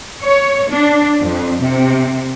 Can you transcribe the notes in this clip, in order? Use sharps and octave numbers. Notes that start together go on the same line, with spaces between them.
C#5
D4
F2
C3